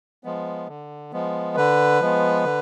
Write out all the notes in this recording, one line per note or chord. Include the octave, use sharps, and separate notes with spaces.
F3 G#3 B3
D3
F3 G#3 B3
D3 B4
F3 G#3 B3
D3